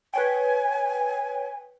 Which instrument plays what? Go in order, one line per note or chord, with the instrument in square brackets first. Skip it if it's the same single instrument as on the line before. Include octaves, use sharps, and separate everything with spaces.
[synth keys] B4 C#5 G5 [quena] G#5